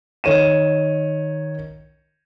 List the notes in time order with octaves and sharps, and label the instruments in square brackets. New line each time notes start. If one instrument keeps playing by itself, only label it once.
[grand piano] D#3 C#5 D#7 E7